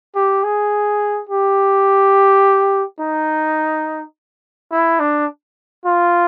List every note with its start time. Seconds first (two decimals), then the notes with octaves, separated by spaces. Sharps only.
0.15 G4
0.44 G#4
1.29 G4
3.00 D#4
4.71 E4
5.00 D4
5.85 F4